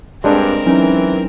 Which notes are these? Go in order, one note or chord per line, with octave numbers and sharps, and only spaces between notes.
G2 G#3 C4 D4 A#4
E3 F#3 C#4 D#4